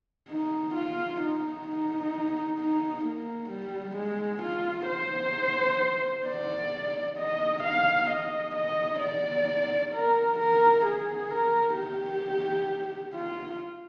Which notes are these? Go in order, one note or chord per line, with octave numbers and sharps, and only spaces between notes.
D#4
F4
D#4
D#4
D#4
A#3
G3
G#3
F4
C5
D5
D#5
F5
D#5
D#5
D5
A#4
A#4
G#4
A#4
G4
F4